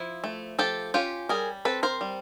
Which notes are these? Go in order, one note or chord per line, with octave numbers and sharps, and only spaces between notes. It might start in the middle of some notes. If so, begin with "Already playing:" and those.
Already playing: F3 E4
A3
F3 G4 A4
C#4 F4 G4
G3 G#4 A#4
C4 A4 B4
A#4 C5
G3